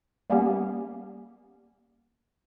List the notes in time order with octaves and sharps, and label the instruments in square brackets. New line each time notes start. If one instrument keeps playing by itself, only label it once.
[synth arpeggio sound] G3 A#3 B3 C#4 G4